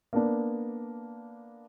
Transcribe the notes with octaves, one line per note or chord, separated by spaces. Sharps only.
A#3 B3 D4